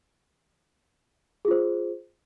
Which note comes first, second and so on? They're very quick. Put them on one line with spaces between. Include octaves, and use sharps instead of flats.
G#4 F4 C5